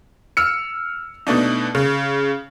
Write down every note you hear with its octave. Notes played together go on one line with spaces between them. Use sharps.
E6 F6 C#7
B2 A3 D4 D#4
C#3